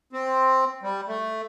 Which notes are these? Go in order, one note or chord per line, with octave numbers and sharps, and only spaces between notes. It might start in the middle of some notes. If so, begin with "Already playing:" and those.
C4
G3
A3